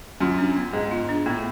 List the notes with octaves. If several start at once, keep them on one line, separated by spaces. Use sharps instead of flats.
F#2 F4
D4
B3
G#2 B3
F4
D4
A2 B3